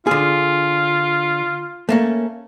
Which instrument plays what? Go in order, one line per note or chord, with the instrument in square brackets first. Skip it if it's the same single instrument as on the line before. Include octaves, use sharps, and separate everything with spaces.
[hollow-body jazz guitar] D3 G#4 [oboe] F4
[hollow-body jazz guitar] A3 A#3 C#4